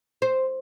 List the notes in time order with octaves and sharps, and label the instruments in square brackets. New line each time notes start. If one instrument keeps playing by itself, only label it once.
[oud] C5